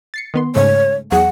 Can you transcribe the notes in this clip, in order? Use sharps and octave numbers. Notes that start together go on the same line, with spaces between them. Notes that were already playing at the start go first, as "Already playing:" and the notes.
A6 C7 C#7
D#3 B3 C6
G#2 C#3 A3 C#5
E2 F#3 G#4 F#5